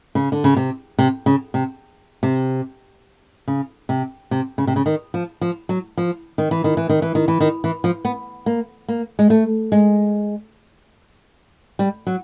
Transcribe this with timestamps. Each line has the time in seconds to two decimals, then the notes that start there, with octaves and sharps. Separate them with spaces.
0.15 C#3
0.32 D3
0.44 C#3
0.57 C3
0.99 C3
1.26 C#3
1.54 C3
2.23 C3
3.48 C#3
3.89 C3
4.31 C3
4.58 C#3
4.67 C3
4.76 C#3
4.86 D#3
5.14 F3
5.41 F3
5.69 F#3
5.98 F3
6.38 D#3
6.51 E3
6.64 D#3
6.77 E3
6.89 D#3
7.02 E3
7.15 D#3
7.28 E3
7.41 D#3
7.64 E3
7.84 F3
8.05 B3
8.46 A#3
8.88 A#3
9.19 G#3
9.30 A3
9.72 G#3
11.79 G3
12.07 F#3